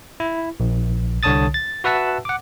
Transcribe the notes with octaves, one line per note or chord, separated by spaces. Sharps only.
E4
A#1
C2 D3 C#5 A5 D#6 A6
A6
F#4 B4 E5 F#5 A5 E6
F#5 D6